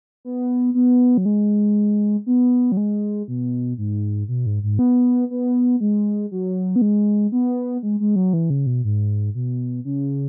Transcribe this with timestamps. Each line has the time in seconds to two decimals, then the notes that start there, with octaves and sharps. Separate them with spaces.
0.25 B3
0.74 B3
1.18 F#3
1.26 G#3
2.26 B3
2.72 F#3
2.77 G#3
3.28 B2
3.78 G#2
4.28 B2
4.46 G#2
4.63 G#2
4.79 B3
5.30 B3
5.81 G#3
6.31 F#3
6.76 B3
6.82 G#3
7.32 B3
7.83 G#3
8.00 G#3
8.16 F#3
8.33 E3
8.50 C#3
8.66 B2
8.84 G#2
9.35 B2
9.85 C#3